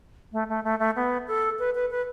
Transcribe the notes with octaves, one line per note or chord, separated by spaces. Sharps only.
A3
A3
A3
A3
B3
A4
B4
B4
B4